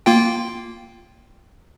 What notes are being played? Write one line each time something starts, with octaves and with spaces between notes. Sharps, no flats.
A#3 F4 G5